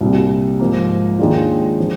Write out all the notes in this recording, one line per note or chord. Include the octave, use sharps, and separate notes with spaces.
C2 A#2 G3
G#2 F3 A#3
D#2 D#3 G#3 D4 F4
F3